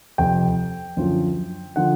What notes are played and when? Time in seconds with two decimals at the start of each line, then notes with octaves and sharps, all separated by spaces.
0.18 F2 C3 F3 G5
0.97 F#2 D3 F3
1.76 D3 F3 F#5